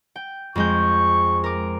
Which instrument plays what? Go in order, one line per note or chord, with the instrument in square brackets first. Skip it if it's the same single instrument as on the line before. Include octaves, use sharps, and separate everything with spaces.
[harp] G5
[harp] F2 G#3 G6 [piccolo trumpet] C#6
[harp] A#4 D6